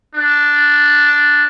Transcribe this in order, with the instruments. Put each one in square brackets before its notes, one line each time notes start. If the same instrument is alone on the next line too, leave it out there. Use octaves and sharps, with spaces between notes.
[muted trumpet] D4